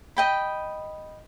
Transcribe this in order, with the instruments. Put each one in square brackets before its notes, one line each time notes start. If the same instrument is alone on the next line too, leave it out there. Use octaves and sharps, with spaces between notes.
[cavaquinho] D#5 G5 B5